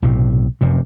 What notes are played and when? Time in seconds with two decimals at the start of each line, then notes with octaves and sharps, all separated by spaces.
0.02 B1 A2 C3
0.61 F1 F#2 C3